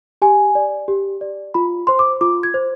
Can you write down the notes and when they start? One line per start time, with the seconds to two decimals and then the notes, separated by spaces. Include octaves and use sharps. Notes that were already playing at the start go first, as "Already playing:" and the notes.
0.22 G4 G#5
0.55 D5
0.88 G4
1.21 D5
1.54 F4 B5
1.87 C5 C6
1.99 D6
2.21 F4 D6
2.43 G#6
2.54 C5